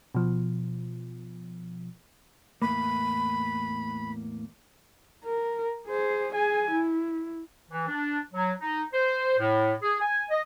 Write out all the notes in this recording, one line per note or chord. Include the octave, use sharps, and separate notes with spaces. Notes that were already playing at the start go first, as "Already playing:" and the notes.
B2 F3
E2 A2 A#3 B5
A#4
G#4 C5
G#4 G#5
E4
E3
D4
F#3
D#4
C5
A2
G#4
G#5
D#5